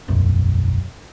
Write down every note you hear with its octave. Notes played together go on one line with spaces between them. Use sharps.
E1 B1 F#2